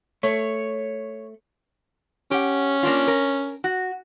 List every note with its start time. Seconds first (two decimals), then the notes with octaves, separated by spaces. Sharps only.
0.23 A3 C#5
2.31 C#4 G4 F#5
2.83 A#3 D4 F4
3.07 A#4
3.64 F#4